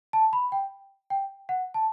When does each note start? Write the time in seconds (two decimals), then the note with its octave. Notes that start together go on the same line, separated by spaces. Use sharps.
0.13 A5
0.33 B5
0.52 G5
1.10 G5
1.49 F#5
1.74 A5